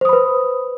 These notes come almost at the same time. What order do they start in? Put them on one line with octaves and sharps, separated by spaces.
C5 D#6 B5 B4